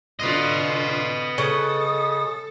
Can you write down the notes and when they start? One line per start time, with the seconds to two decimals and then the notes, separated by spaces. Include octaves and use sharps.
0.20 D3 F4 B4 D#5
1.38 C#3 A4 D#6